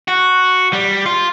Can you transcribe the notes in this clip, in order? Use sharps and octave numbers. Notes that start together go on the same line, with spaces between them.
F#4
G3
F4